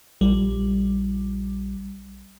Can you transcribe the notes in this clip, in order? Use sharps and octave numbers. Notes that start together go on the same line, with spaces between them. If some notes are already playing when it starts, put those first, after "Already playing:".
A#1 G3